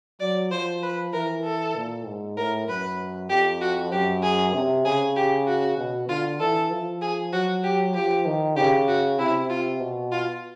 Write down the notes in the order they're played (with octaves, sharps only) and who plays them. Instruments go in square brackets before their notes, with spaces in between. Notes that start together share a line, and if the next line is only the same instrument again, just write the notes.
[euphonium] F#3 [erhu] D5
[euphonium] F3 [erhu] C5
[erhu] B4
[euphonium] E3 [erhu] A#4
[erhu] A4
[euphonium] A#2
G#2
[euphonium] A2 [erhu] A#4
[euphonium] F#2 [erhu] B4
[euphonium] F2 [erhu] G4
[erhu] F#4
[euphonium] F#2 [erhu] G4
[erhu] G#4
[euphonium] C3
[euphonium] C#3 [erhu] G#4
[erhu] G4
F#4
[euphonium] B2
[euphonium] D3 [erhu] F4
[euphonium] E3 [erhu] A4
[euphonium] F3
[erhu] G#4
[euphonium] F#3 [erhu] F#4
[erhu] G4
[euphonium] F3 [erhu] G4
[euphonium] D#3
[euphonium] C#3 [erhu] G4
[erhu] F#4
[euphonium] C3 [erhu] E4
[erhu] F4
[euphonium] B2
[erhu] F4